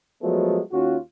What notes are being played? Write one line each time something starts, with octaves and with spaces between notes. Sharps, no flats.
F3 F#3 G#3 A3 B3
D#2 C#4 F4 F#4